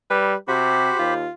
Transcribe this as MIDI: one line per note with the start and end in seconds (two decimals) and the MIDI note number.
0.10 0.34 55
0.10 0.35 71
0.48 0.90 48
0.48 0.94 66
0.48 1.14 67
0.48 1.14 72
0.48 1.14 83
0.99 1.26 39
0.99 1.31 65